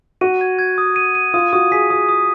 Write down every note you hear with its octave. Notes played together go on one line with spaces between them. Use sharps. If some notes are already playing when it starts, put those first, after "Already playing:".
F#4 D#7
G#6
G#6
D#6
D#7
D#7
F4 D#6
F#4 D#6
G#4 B6
G#4 D#6
D#6